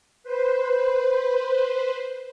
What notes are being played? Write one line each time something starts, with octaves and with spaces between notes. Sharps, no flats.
B4 C5